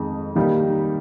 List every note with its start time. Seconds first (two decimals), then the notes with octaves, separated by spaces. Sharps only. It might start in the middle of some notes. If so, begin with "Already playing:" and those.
Already playing: F2 D#3 G#3 D#4
0.36 D#3 G3 A#3 D#4 G4